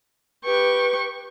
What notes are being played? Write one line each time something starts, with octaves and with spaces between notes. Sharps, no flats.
G4 B4 C#6